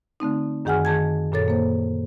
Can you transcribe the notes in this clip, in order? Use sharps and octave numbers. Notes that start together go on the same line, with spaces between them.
D3 A3 C4 D#4
F#2 D#3 G#4 F#5 G#5 F6
D#3 G#4 A5 G#6
F#2 A#2 A4 C#5 A6
A#3 C5